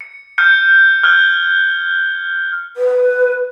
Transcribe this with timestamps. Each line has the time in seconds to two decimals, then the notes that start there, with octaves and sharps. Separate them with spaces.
0.01 C#7
0.38 F6 G6 C#7
1.04 F6 F#6 G#6 G7
2.76 B4